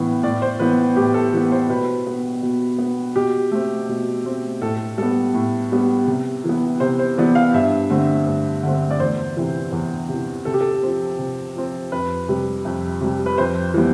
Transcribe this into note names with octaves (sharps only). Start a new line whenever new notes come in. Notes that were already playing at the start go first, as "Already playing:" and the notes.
Already playing: A2 E3 B3
A2 D5
C5
E3 B3 B4
A2 G4
A4
E3 B3
C5
B2 B4
B3
B2
B3
B2 G4
A3 C4
B2
A3 C4
A2 A4
G3 B3 A4
A2
G3 B3
C3
E3 B3
C3 C5
C5
E3 B3 D5
F5
G2 E5
D3 A3 C4
G2
D3 A3 C4
D5
E2 C5
C3 E3
E2
C3 E3
C3 A4
G4
A4
F3 C4
C3
F3 C4
F2 B4
C3 G3
F2
C3 G3
B4
F2 C5
E3 G3 B3